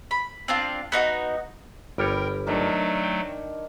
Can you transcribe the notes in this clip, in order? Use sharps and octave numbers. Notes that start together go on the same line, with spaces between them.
B5
C4 D4 F4
B3 D#4 E4 F#4
G1 G3 A#4 B4 C#5 G5
D#3 F#3 A3 D4 A#4
G5